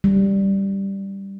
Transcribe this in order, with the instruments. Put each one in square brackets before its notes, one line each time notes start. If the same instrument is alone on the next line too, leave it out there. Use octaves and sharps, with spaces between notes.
[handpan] G3